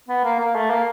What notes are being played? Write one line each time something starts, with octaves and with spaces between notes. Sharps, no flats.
B3
A#3
A#3
A3
A#3